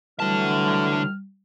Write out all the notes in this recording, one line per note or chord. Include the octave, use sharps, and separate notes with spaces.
D3 E3 F#3 G3 A3 A5 F6